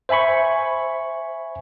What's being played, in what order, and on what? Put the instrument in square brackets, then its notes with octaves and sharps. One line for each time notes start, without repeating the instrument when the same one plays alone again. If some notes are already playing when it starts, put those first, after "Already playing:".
[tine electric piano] C5 E5 G#5 B5 C#6